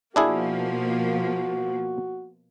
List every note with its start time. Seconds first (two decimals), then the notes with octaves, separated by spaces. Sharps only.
0.16 B2 F3 A#3 D4 E4 F#4 G#4